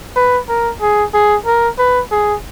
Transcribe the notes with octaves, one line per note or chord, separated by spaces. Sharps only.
B4
A#4
G#4
G#4
A#4
B4
G#4